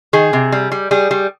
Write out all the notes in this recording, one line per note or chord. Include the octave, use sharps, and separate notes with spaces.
D#3 G#4
C3
G3
G3
G3 G#4
G3